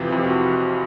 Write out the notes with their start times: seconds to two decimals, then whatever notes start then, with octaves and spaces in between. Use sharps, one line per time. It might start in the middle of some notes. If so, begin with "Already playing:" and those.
Already playing: F2 C3 E3 F4
0.11 F2 C3 E3
0.24 F#4